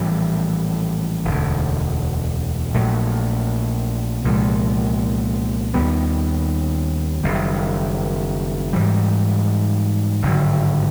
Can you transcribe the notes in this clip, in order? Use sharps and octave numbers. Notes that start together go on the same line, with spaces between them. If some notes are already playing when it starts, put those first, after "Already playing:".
Already playing: A#1 A2 E3 G3
E1 D2 D3
A#1 A#2 F#3 A3
C2 A#2 F3 G#3
D#2 D#3 G3 B3
F#1 F#2 D#3 G3
G#2 E3 G3
G#1 G2 D3 F#3